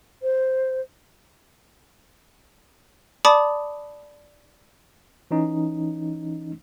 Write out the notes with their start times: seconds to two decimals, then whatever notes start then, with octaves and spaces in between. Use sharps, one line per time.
0.22 C5
3.25 D5 A5 B5 D6 D#6
5.31 E3 C#4 D#4